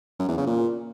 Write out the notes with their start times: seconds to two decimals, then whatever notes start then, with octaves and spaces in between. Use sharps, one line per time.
0.19 F#2
0.28 E2
0.37 C#3
0.46 A#2